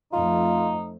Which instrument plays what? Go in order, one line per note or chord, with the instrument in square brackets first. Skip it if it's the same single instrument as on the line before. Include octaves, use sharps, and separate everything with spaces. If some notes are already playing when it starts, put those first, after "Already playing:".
[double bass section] F2 A3 [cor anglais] D#4 [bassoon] F4